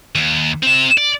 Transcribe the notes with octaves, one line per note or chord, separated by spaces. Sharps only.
D#2
C4 E5
D5